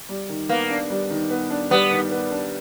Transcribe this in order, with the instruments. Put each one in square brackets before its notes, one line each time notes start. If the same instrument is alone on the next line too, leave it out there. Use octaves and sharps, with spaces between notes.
[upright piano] G3
D#3
[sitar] A#3 [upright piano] B3
[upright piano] D4
G3
D#3
B3
D4
[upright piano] G3 [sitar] B3
[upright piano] D#3
B3
D4